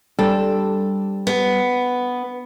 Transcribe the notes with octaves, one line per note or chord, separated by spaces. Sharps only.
G3 C4 D4 A4
B3